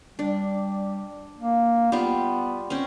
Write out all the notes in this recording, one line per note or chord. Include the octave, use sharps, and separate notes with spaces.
G3 D4
A#3
G3 B3 F4
C4 C#4